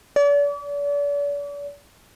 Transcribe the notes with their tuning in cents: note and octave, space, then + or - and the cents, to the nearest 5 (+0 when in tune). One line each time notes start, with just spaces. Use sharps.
D5 -40